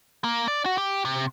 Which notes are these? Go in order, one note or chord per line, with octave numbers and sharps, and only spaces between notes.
A#3
D5
F#4
G4
C3